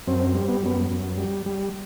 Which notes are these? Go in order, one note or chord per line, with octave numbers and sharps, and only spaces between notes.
F#2 C4
G3
B3
F#2 B3
F#2
G3
G3